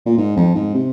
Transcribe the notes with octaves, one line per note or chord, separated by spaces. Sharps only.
A#2
G#2
F2
G#2
C3